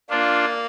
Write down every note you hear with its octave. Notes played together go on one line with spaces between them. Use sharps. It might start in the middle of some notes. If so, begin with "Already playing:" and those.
A#3 D4 F4